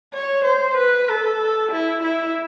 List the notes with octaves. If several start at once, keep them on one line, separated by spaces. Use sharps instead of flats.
C#5
C5
B4
A4
E4
E4